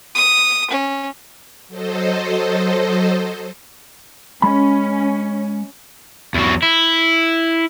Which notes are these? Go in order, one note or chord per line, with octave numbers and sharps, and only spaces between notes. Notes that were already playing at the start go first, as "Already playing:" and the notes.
D#6
C#4
F#3 A4 C5 D#5
G#3 C#4 B5
E2 F#3
E4